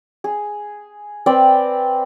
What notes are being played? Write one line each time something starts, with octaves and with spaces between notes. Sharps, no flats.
G#4
C4 B4 D5 G5